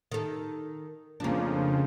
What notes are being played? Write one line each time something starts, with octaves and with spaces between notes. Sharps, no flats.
D#3 A4
F2 C#3 F3 A#3 D4